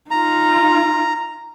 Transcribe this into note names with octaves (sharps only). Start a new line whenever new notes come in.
D#4 F4 A#5